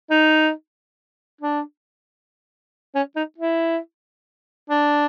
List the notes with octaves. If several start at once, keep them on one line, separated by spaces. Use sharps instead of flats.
D#4
D4
C#4
D#4
E4
D4